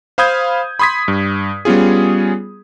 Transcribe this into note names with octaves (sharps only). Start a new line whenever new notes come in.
C5 F5 B5 D#6 G6 G#6
B5 C6 D#6 G#6 B6
G2
G3 B3 C#4 F4 G#4